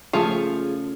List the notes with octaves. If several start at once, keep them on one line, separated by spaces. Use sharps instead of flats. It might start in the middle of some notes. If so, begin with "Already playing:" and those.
C#3 F3 A3 F4 G#4